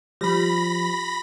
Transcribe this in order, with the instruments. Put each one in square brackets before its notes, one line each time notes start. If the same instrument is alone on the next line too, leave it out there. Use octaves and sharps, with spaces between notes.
[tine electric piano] F3 [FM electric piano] G3 [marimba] F4 G4 [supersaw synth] B5 A#6